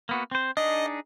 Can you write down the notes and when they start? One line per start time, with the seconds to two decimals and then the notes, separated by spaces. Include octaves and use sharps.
0.09 A#3 B3 F#4
0.31 C4 C5
0.57 D4 D#4 G#4 D#5